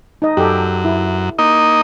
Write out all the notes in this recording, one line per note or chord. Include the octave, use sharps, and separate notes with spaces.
D#4 D#5
F#2 G4 A4
E4
A#3 D#4 D#5